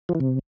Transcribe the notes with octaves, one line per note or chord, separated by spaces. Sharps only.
F3
E3
C3